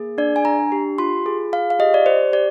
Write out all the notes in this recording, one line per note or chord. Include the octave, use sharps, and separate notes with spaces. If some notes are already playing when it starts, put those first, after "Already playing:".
Already playing: A#3 G#4
D4 D5
G#5
D4 A#5
G4
F4 C6
G#4
F4 F5
F5
G4 D#5
D5
G4 C5
G4 D5